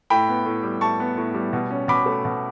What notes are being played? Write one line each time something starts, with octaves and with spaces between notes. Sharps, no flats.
A2 G5 B5
B3
A2
G3
A2 A5 C#6
B3
A2
G3
B2
C#4
B2 B5 D6
A3
B2